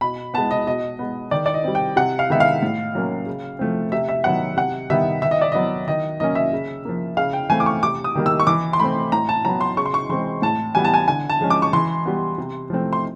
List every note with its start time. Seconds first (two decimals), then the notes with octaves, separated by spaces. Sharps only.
0.01 B2 B5
0.34 G#3 B3 A5
0.51 D#5
0.67 B2 D#5
0.99 G#3 B3
1.31 D#3 D5
1.46 D5
1.54 D#5
1.64 G3 C4
1.75 G5
1.96 C3 F#5
2.19 F5
2.30 D#3 G#3 B3 E5
2.40 F5
2.63 A2
2.95 F#3 A#3 C#4
3.26 C#3
3.59 F3 A3 C4
3.92 C3 E5
4.09 E5
4.24 D#3 F#3 B3 F#5
4.57 C3 F#5
4.90 D#3 G3 B3 E5
5.22 D#3 E5
5.31 D#5
5.41 D5
5.52 F#3 B3 D#5
5.87 D#3 D#5
6.20 F#3 A#3 C#4 D#5
6.35 E5
6.53 C#3
6.85 F3 A#3
7.17 C#3 F5
7.33 G5
7.50 E3 A3 C4 G#5
7.60 D6
7.66 C#6
7.83 C3 D6
8.04 D#6
8.15 D#3 G3 A#3
8.26 E6
8.40 C#6
8.47 E3 D6
8.73 C6
8.80 A3 C4 B5
9.12 A2 A#5
9.29 A5
9.45 F#3 B3 A#5
9.61 C6
9.77 C#3 C#6
9.86 C6
9.94 C#6
10.09 E3 G#3 C4 C6
10.42 A2 A5
10.75 E3 G3 B3 G#5
10.85 A5
10.94 G#5
11.08 D3 G#5
11.29 A5
11.41 F3 G#3 C#4
11.50 D6
11.62 C#6
11.73 E3 C6
12.05 G3 B3
12.38 C3
12.70 F3 A3 C4
12.93 C6